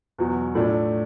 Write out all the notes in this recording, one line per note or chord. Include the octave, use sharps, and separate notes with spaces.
E2 B2 F#3
A2 F3 A3 D4